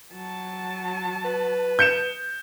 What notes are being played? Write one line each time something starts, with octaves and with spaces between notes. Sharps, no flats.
F#3 A5
B4
G6 C#7 E7